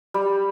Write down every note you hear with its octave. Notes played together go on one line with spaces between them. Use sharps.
G3